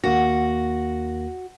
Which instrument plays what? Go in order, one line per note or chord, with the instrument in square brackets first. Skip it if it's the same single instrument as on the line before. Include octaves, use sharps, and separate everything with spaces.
[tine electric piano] D#2 A#3 A#6 [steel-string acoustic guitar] F#4